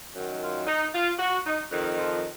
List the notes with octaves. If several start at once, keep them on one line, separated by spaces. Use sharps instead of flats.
F#2 D#3
F4
D#4
F4
F#4
D#4
F2 D#3
F3